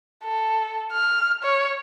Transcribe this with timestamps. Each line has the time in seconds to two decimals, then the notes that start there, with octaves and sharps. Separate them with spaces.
0.24 A4
0.93 F6
1.43 C#5